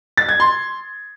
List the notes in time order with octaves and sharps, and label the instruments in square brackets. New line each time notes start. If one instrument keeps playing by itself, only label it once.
[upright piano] A6
G#6
C6